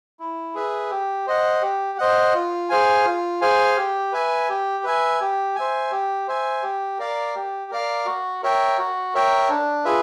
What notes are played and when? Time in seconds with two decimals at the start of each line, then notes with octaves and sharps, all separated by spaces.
0.20 E4
0.55 G#4 B4 E5
0.91 G4
1.27 C5 D#5 F#5
1.62 G4
1.98 C5 D#5 F#5
2.34 F4
2.69 G#4 C5 F5 G#5
3.05 F4
3.41 G#4 C5 F5 G#5
3.77 G4
4.12 B4 E5 G#5
4.49 G4
4.84 B4 E5 G#5
5.21 G4
5.55 C5 E5 G#5
5.92 G4
6.28 C5 E5 G#5
6.63 G4
6.99 A#4 D5 F5
7.35 G4
7.71 A#4 D5 F5
8.06 F#4
8.43 A#4 C#5 E5 G5
8.78 F#4
9.14 A#4 C#5 E5 G5
9.49 D4
9.85 F4 G#4 B4 E5